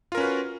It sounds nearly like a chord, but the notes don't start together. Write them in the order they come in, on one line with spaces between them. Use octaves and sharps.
F4 A#4 C#4 B4 F#4